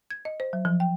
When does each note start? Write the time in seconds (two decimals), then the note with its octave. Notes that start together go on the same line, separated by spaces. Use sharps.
0.10 G#6
0.25 D#5
0.40 C5
0.53 F#3
0.65 F3
0.80 G5